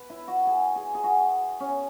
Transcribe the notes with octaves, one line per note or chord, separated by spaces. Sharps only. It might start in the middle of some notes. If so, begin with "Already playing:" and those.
Already playing: B4
E4
F#4
G#4
G#4
G#4
F#4
C#4